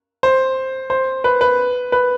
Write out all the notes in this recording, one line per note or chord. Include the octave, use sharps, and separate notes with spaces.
C5
C5
B4
B4
B4